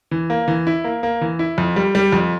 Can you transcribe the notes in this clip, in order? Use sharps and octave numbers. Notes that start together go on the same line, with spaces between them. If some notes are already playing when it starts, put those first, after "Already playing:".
E3
A#3
E3
E4
A#3
A#3
E3
E4
F2
G3
G3
F2